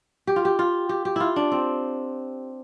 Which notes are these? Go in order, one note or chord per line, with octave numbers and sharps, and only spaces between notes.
G4
F4
G4
F4
G4
G4
E4 F4
D4
C4